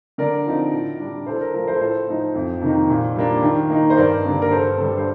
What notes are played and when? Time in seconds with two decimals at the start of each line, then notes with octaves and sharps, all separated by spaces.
0.18 D3 A#4 D5
0.46 F3 C4 D#4
0.73 A2
1.00 G3 D4
1.27 A2 A4 C5
1.41 A#4
1.54 F3 A3 A#4
1.67 A4 C5
1.81 A2 A4 C5
2.08 F3 A3 D#4
2.35 F2
2.62 C3 D#3 A#3 D#4
2.89 A#2
3.16 G3 A#3 D4
3.43 D#3
3.70 A#3 D#4
3.90 C5
3.97 G2 A#4 D5
4.25 D3 G3 A#3 D4
4.42 A#4
4.51 G2 A4 C5
4.78 D3 G3 A4
4.98 C5